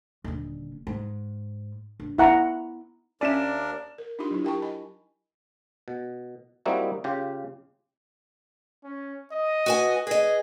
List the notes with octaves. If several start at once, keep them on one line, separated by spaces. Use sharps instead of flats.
D#1 D3
G#2
G2
B3 D#4 E4 F#5 A#5
D#2 C#4 D4 A#4 D5 E5 G#5 E7
A#4
D4 D#4 F4 G4 B5 C6
F#3 D4 E4
G4 A#4 G5 A5 B5 C#6
D#5 G#5 B5
B2
G3 A#3 C4 D#4 E4 F#4
C#3 F4 G4
C#4
D#5
F#4 B4 G#5
G#4 B4 D#5